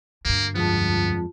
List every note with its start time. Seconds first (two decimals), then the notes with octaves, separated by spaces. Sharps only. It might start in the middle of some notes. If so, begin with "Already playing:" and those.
0.25 D2 G2 A#3
0.55 F2 F3 G#3 B3 F4 A5